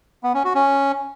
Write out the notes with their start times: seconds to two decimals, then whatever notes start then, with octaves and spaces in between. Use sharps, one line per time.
0.24 B3
0.34 C#4
0.44 F#4
0.55 C#4